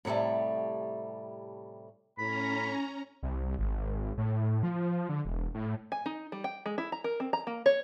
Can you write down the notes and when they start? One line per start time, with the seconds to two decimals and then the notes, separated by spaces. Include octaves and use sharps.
0.05 A2 C3 F#3 G3 A3
2.18 A2 C#4 A#5 B5
3.23 C2
3.58 G#1
4.18 A2
4.63 F3
5.09 D3
5.25 E1
5.54 A2
5.92 G#5
6.06 D#4
6.32 G3
6.44 G5
6.66 G#3
6.78 E4
6.92 A#5
7.04 A#4
7.20 C4
7.33 A#5
7.47 A#3
7.66 C#5